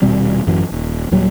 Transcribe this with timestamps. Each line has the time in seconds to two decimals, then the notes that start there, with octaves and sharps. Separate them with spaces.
0.02 D#1 B2 G3 C4
0.46 A1 F#2 E3 F#3
0.72 D#1
1.11 D#2 A#2 F#3 G3